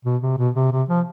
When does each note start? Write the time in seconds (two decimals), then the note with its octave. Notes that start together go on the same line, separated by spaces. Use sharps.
0.05 B2
0.22 C3
0.38 B2
0.56 C3
0.72 C3
0.89 F3